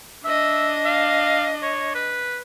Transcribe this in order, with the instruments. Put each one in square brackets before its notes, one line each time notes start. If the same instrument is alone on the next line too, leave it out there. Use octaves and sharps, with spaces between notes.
[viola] D4 D#5 [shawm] E5
[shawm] F5
C#5
B4